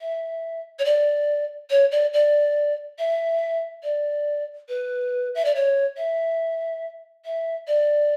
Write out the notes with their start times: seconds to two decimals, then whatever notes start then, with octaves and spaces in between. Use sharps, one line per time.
0.01 E5
0.79 C#5
0.85 D5
1.70 C#5
1.92 D5
2.13 D5
2.99 E5
3.83 D5
4.69 B4
5.35 E5
5.45 D5
5.55 C#5
5.97 E5
7.25 E5
7.68 D5